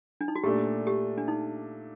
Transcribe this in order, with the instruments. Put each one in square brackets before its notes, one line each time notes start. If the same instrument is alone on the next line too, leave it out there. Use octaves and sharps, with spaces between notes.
[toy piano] D4
D#4
F#4
[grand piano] A#2 A3 D4 [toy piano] G4
[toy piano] G4
D4
D#4